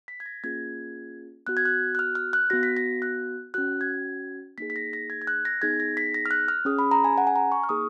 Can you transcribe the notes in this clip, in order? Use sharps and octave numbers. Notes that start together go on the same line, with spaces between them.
B6
G#6
A#6
A#3 C#4 F4 G#4 G#6
B3 F#4 F#6
G#6
F#6
F#6
F6
F6
F#6
B3 F#4 A#6
B6
A#6
F#6
C#4 F#4 F#6
G#6
A#3 D#4 G#4 B6
B6
A#6
A#6
G#6
G#6
F#6
A#6
B3 D#4 G#4 G#6
A#6
B6
A#6
F6
F#6
F6
C#4 G#4 D#6
B5
A#5
G#5
F#5
G#5
A#5
C#6
F6
A#3 D#4 G#4 D#6